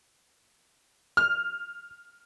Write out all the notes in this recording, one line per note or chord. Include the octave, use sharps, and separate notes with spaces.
F6